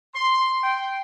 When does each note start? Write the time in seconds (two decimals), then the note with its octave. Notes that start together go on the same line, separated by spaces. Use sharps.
0.15 C6
0.63 G5